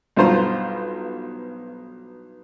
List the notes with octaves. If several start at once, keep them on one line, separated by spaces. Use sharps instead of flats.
B1 G2 F4 C5 A#5 C6